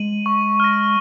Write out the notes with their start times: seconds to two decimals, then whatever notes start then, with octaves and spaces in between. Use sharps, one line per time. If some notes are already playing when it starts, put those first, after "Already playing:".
Already playing: G#3 D#7 F#7
0.26 C#6
0.60 F6 A#6